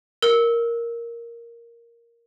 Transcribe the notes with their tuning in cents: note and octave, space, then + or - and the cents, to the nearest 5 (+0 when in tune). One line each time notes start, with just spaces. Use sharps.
A#4 +0 E6 -20